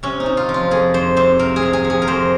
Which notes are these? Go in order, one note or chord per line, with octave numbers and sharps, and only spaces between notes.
C3 C#4
D#4
C3
F4
F3
F4
F2 G#4
F2 C5
C3 C5
C3 A#4
G#4
C3
G#4
F3
G#4
A#4
F2 C5